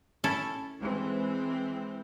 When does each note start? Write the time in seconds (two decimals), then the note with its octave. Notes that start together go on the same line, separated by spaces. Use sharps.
0.24 C#4 E4 A4
0.79 E3 G#3 C4